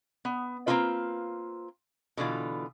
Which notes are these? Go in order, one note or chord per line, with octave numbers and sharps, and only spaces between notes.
B3
A#3 C4 C#4 D#4 F4 B4
B2 D3 E3 F4